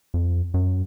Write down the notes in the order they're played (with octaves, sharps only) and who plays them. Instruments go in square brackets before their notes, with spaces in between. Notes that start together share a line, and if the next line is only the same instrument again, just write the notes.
[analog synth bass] F2
F#2